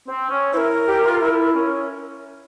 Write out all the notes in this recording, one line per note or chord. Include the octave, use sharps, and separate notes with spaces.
C4
C#4
E4 A#4 C5
G4
F4
E4
C#4